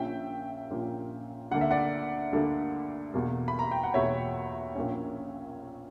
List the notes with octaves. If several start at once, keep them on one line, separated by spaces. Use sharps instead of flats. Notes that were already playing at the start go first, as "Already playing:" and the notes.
Already playing: A#1 A#2 A#3 C#4 E5 G5
A#1 A#2 A#3 C#4
D2 D3 A#3 D4 F#5
E5
D5 F#5
D2 D3 A#3 D4
E2 B2 A#3
B5
A#5
G5
F#5
E2 B2 A#3 C#5 E5
A#1 A#2 A#3 C#4